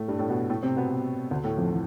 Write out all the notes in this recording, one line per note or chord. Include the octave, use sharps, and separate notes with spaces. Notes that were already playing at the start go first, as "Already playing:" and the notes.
Already playing: A2 A3
G2 G3
A2 A3
B2 B3
A2 A3
C3 C4
B2 B3
D2 D3
A2 A3
F2 F3
E3